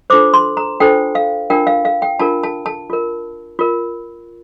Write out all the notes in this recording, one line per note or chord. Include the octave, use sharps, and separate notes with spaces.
D4 F4 A4 C5 D6
C6
A#5
D4 F4 A4 C5 G5
F5
D4 F4 A#4 G5
F5
F5
G5
D4 F4 A#4 A5
A5
A5
F4 A#4
F4 A#4